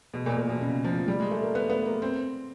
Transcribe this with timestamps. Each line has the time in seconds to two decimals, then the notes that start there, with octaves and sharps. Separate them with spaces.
0.14 B2
0.26 A#2
0.38 A#2
0.49 B2
0.61 C#3
0.84 F3
1.08 G3
1.20 G#3
1.31 A3
1.43 A#3
1.55 B3
1.70 B3
1.85 A#3
2.02 C4